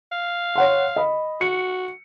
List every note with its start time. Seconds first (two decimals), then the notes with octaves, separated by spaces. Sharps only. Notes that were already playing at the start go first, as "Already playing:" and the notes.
0.12 F5
0.56 C#5 F#5 C6
0.96 D#5 B5
1.41 F#4 C#7